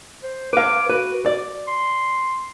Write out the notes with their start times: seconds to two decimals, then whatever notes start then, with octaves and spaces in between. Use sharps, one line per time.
0.23 C5
0.53 B4 F5 D6
0.90 F#4 B4
1.26 D5
1.67 C6